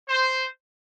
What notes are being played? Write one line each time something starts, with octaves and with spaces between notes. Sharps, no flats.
C5